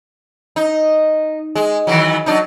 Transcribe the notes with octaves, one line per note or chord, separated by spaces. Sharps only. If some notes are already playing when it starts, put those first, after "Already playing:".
D#4
G#3
D#3 E3 F#3
F#3 D4 D#4